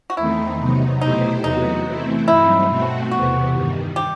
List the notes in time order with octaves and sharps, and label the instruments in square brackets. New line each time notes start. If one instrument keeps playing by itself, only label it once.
[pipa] F#4
[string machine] E2 D#3 A3 C4 D#4 [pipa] E4
[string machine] C3 F#3 B3 D#4
[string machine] B2 A3 E4 G4 C5 [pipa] D#4
[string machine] E2 C3 F#3 B3 F#4 [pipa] D#4
[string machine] E3 A3 C4 E4
[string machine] G2 F#3 C4 D#4 [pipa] E4
[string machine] B2 A3 C4 F#4
[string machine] E2 C3 E3 B3 [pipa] F#4
[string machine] G2 D#3 G3
[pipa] G4